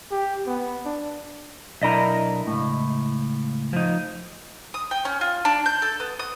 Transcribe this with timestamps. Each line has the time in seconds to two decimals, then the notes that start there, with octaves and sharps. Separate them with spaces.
0.11 G4
0.46 B3
0.85 D4
1.82 B1 D4 E4 A#4 D#5 E5
2.47 C#2 A2
3.73 F3 D#4
4.74 D#6
4.91 G5
5.05 C#4
5.21 F4
5.45 D4
5.66 G6
5.82 A4
6.00 B3
6.19 D#6